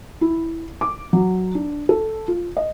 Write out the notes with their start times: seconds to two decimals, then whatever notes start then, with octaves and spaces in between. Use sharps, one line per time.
0.21 E4
0.81 D6
1.13 F#3
1.55 D4
1.89 A4
2.28 F4
2.57 D#5